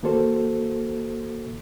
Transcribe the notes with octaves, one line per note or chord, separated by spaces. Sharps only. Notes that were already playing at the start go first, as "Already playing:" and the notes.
D#3 A#3 F#4 A4 C5